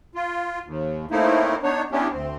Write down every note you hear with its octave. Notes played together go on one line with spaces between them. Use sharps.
F4
D#2
A2 A3 A#3 C4 D#4 E4
B3 D4 D#4 C#5
G3 B3 C#4 D4 E4 G4
D2 C4